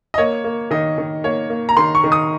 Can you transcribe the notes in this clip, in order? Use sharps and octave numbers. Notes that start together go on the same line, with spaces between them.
D#5
A#3 C#5
A#3
D#3 D#5
D#3
A#3 C#5
A#3
A#5
D#3 C6
C#6
D#3
D#6